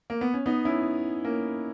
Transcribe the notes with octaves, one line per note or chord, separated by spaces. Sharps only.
A#3
B3
C#4
B3 D#4
C#4 E4
A#3 C#4